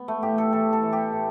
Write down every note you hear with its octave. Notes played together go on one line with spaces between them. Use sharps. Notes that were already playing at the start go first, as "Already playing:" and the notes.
Already playing: B3
A3
A2 G4
A4
E3 A4
A4
E3
G4
A2